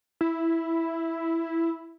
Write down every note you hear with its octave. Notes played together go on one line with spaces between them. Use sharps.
E4